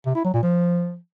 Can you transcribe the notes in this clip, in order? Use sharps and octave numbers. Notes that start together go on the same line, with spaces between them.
C3
E4
F#3
A#2
F3